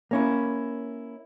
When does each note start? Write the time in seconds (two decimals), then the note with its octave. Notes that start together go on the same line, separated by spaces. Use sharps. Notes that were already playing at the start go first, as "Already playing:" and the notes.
0.11 A#3 C#4 E4